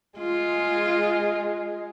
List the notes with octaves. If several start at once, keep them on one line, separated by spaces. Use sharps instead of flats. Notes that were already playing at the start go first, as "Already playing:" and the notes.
G#3 F4